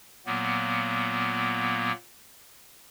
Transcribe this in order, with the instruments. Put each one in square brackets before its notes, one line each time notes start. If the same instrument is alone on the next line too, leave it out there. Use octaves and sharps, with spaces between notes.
[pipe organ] A#2 F#3 A#3 B3